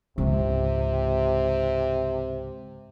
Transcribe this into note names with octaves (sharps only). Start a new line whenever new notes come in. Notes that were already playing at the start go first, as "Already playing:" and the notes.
C#2 G#2 C3